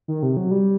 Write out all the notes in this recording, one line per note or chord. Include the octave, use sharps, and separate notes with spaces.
D#3
C3
F#3
G3